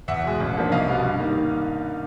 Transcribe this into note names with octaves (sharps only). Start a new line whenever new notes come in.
E2 E5 F#5
B2 G#3
A1
G#2 F3 A#3 D4
C2 D#5 F5
B2 G3 B3
G2
D#3 G3 A#3 D#4